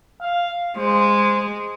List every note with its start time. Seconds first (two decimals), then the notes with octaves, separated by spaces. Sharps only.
0.21 F5
0.77 G#3 C5